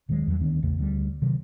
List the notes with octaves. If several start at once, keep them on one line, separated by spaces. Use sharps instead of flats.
D#1 D#3 F#3 G#3
E2 F#3
D2 D#3 B3 D4
A#1 E2 C#3 A3
D2 D3 F#3 G3
C3 D#3 F#3